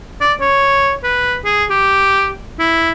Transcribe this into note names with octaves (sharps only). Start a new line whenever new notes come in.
D5
C#5
B4
G#4
G4
E4